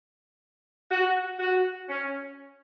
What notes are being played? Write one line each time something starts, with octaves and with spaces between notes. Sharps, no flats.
F#4
F#4
C#4